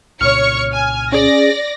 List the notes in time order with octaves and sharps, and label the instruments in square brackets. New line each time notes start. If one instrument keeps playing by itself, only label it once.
[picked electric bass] C2 A#2 C#3 [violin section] C#5 C#6 C#7 [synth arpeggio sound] F6
[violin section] G#5
[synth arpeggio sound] C#4 G#4 [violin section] D5 A#6